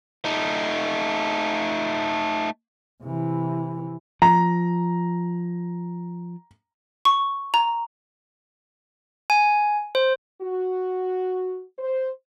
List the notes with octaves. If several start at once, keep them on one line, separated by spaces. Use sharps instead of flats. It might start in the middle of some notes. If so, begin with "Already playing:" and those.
A3 D#4
C3 E3
F3 A#5
C#6
A#5
G#5
C5
F#4
C5